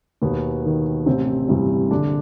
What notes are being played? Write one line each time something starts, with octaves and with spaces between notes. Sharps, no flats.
D#2 B2 B3
D#3
A1 C3 C4
G2 C3 E3 C4
A#1 D3 D4